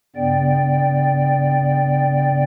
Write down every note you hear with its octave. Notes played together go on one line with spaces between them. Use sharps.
G2 C#3 B3 D5 G5